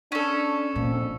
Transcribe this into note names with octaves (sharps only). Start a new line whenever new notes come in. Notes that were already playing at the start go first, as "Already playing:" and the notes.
C#4 D4 A4
F2 A#2